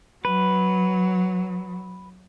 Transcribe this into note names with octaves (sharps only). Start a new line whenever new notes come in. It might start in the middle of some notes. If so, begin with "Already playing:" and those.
F#3 B4